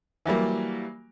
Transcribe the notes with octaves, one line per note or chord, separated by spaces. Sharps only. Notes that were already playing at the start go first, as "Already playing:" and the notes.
E3 F#3 G3 A#3